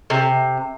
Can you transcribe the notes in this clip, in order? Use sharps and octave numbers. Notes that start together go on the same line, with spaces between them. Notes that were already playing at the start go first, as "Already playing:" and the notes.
C3